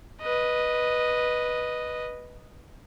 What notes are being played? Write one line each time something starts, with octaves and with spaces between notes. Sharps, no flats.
B4 D#5